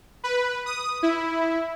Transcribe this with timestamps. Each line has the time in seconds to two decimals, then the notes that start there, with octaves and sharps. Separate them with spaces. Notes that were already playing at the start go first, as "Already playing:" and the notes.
0.24 B4
0.66 D#6
1.03 E4